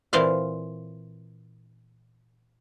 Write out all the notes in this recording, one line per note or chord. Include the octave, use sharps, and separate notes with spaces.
A#2 E3 C4 C5 D5 F5